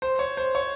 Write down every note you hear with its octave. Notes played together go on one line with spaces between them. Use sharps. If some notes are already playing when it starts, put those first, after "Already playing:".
C5
C#5
C5
C#5